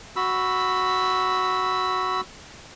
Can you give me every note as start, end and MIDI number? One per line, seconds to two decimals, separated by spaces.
0.16 2.21 66
0.16 2.21 83
0.16 2.21 88